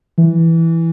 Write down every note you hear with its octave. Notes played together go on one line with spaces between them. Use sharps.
E3